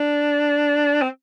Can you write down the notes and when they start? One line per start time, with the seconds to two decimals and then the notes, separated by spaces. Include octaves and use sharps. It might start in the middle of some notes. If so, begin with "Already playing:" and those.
Already playing: D4
1.02 C4